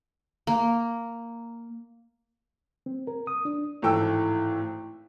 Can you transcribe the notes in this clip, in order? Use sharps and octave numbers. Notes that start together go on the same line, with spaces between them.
A#3
C4
A#4
D#6
D4
G#1 A2 E3 A4 G5 E6